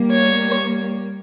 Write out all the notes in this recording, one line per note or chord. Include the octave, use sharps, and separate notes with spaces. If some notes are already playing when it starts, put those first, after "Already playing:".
Already playing: G3 A#3
C#5